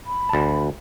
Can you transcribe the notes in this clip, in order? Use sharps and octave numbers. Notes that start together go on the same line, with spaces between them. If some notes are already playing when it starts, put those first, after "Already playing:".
B5
D2 A5